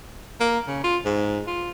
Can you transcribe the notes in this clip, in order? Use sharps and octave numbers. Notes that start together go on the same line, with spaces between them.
A#3
C#3
F4
G#2
F4